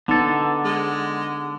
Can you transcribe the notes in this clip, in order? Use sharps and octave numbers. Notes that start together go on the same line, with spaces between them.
D3 B3 D#4 A4
G#3